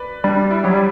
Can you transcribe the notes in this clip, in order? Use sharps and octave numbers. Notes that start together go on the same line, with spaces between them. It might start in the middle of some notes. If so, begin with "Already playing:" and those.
Already playing: B4 D5
G3 D4
D4
E4
F#3 G4
G3